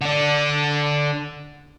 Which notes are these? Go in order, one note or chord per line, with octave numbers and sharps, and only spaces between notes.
D3 D4